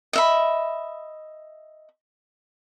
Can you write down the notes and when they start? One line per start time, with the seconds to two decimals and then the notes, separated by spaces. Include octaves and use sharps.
0.13 D#5 E5 B5